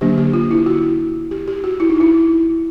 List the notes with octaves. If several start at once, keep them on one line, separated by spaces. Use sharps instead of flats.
D3 F#3 A#3 D4 G4
G4
F4
E4
F#4
G4
G4
F#4
E4
D#4
E4